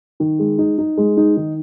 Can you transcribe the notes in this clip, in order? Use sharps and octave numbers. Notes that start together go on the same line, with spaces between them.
D#3
G#3
D#4
D#4
G#3
D#4
D#3